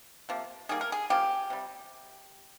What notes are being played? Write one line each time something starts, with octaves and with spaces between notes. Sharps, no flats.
C3 F3 A#3
D#3 G3 A#3 G#4
A#4
G#4
C#3 F3 A#3 G4
C3 G3